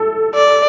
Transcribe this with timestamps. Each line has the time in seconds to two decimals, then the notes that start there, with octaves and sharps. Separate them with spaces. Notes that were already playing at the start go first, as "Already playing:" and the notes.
Already playing: A4
0.35 D5